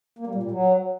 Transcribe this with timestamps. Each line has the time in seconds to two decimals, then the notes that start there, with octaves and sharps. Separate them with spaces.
0.19 A#3
0.27 G3
0.35 A#2
0.43 G3
0.51 F#3